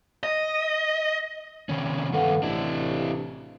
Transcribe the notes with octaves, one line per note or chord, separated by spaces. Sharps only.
D#5
C3 D#3 C#4
G2 D#3 A4 B4 F5 F#5
A1 C3 D4 E4